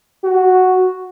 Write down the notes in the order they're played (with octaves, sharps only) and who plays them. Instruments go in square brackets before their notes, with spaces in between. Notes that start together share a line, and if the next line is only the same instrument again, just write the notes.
[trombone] F#4